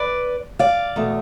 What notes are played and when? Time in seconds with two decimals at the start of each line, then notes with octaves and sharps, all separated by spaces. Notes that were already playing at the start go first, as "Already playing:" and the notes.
Already playing: B4 D5
0.59 D5 F5
0.96 E2 B2 A3